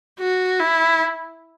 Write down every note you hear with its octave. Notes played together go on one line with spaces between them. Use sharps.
F#4
E4